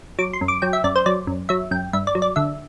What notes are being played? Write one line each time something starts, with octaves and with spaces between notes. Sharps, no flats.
F#3 D6
C6
F#2
D6
F#3 G5
E5
F#2 D5
C5
F#3 D5
F#2
F#3 E5
F#2 G5
G2 E5
D5
F#3
D5
D3 E5